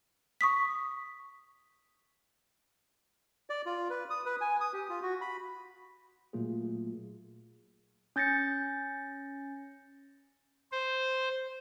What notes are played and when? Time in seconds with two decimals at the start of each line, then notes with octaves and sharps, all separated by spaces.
0.41 C#6 D#6 B6
3.50 D5
3.66 F4
3.90 B4
4.10 D#6
4.25 B4
4.41 G#5
4.61 D#6
4.73 G4
4.90 F4
5.02 F#4
5.21 B5
6.33 A#2 F#3 A3 A#3 F4 G#4
8.16 C#4 G6 A6 A#6 C#7
10.72 C5